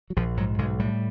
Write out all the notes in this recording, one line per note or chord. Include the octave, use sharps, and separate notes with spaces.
F#3
A#1 F3
G#2 F#3
B1 G#3
A2 G3